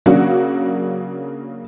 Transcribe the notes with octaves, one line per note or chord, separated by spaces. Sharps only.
C#3 F#3 A#3 D4 F#4